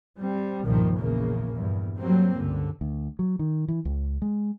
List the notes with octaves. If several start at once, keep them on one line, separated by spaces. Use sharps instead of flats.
G3 C4
G1 C2 A#2 D#3 F3
A#1 E2 C#3 A#3
E2 G2
F#3 G3 A#3 C4
C#2 G2 D3
D2
F#3
D#3
E3
C#2
G#3